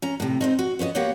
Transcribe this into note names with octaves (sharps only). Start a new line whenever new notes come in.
C#4 A#5
A2 C3
C4 C#4 D#4
F#4
B3 C#4 B4 D#5
A#3 B3 F#4 G4 C#5 F#5